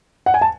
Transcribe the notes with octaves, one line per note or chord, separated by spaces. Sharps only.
F#5
G#5
A5